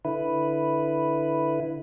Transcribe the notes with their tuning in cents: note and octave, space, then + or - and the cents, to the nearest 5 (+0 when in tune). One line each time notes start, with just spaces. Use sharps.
D3 +0 E4 -5 B4 +0